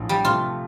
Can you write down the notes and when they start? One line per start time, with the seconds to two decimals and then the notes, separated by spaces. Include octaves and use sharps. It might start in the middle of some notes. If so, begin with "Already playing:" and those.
Already playing: A#1 A2 F3
0.09 G3
0.25 C3 F3 A3 F4